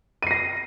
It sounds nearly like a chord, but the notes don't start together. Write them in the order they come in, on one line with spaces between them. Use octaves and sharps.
D#7 C7 A#6